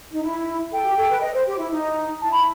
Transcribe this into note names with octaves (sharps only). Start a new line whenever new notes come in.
D#4
E4
A4 G5
G4
A4
B4
D#5
C5
G4
E4
D#4
E4 A5
B5